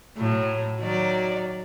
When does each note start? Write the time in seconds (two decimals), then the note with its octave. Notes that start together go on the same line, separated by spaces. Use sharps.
0.17 A2 F#3
0.79 D#3 F#3 D5